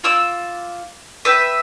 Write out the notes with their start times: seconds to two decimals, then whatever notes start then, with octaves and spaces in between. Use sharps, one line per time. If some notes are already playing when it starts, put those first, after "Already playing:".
0.04 F4 D6 E6
1.25 B4 E5 G5